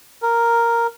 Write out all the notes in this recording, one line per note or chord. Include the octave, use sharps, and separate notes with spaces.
A#4